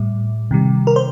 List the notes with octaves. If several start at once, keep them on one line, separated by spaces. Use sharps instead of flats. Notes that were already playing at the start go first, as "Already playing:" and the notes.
Already playing: A2 G3
C3 D#3 G3
A#4
C5